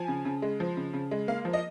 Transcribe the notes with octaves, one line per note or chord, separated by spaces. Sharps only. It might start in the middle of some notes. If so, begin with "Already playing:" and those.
Already playing: F3 G#5
C#3
C#3
G#3
F3
C#3
C#3
G#3
A#3 F5
F3
D#5